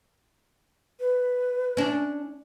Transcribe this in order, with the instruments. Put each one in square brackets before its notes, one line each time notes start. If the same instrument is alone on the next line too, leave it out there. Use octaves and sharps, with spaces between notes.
[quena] B4
[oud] C#4 D4